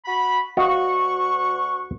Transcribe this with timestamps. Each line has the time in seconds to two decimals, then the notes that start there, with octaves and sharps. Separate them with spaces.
0.05 F#4 B5
0.57 D2 F#4 D#5 F5 F#5 C#6